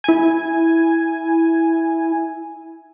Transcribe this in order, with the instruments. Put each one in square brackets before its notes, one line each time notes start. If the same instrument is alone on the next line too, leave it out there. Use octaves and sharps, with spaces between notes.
[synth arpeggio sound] E4 G#5